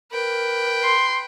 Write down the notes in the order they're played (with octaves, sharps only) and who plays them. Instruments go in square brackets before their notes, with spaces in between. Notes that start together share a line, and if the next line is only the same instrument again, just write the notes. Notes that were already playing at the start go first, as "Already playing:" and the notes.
[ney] A#4 [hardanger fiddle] B4 G5
[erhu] C6